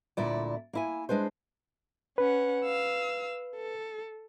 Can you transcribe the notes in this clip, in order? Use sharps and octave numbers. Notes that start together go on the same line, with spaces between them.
D2 A#2 E4 D5
A#3 E4 G#5
G#3 D4 B4 C5
C#4 B4 F#5
F5 E6
A4